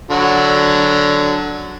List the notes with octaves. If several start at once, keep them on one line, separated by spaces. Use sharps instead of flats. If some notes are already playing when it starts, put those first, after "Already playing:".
D3 F#3 F#4